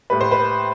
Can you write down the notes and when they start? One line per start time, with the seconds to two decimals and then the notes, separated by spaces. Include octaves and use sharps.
0.10 A2 G3 B4
0.21 C5
0.31 B4